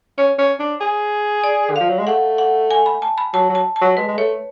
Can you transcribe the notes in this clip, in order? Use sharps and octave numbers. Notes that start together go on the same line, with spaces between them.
C#4 C#5
C#4
D4
G#4
D5
D3
F3 F5
F#3
G#3
A3 F#5
F#5
G#5
B5
A5
B5
F#3 A5
F#3
A5
A5
F#3
G#3 B4
G#3
A3 C#5